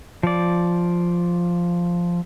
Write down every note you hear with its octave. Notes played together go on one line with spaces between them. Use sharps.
F3 D5